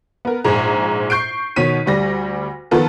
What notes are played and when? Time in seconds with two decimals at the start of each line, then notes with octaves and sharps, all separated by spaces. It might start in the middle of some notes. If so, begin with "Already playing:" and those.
0.25 B3 A#4
0.44 A#1 G#2 G#4 A#5
1.10 C#6 G6 C7 D7
1.56 B2 D#3 C#5 B6 D#7
1.86 D2 G3 A#6
2.71 D#3 F3 B3 F4 A4 A#4